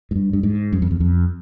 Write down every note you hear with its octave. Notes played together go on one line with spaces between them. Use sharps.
G#2
G2
G2
G#2
F#2
F2
E2
F2